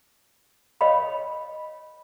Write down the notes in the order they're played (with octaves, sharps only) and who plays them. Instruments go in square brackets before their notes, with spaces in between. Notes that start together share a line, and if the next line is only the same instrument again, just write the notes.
[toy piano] C#5 D#5 F5 B5